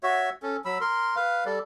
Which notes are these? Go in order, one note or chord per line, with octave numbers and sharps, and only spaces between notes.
F#4 C#5 E5
C#4 A4
F#3 B5 E6
A#4 C6
B4 F5
G3 A4 D5